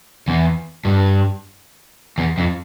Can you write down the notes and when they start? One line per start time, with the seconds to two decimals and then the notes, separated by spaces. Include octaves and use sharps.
0.28 E2
0.85 G2
2.18 E2
2.38 F2